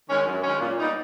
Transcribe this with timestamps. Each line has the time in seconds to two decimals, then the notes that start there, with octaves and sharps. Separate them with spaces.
0.09 D#3 G#3 C#4
0.26 F#2
0.43 D#3 G#3 C#4
0.61 A#2
0.78 G3 B3 D#4